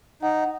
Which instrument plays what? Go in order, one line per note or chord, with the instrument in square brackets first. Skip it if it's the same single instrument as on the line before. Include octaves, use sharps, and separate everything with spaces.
[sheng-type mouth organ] D#4 [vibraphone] F#5